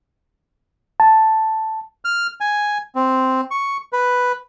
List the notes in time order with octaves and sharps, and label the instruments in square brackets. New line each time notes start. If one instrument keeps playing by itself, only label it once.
[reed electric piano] A5
[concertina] F6
G#5
C4
C#6
B4